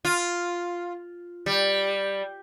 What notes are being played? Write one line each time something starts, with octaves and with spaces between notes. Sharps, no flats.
F4
G3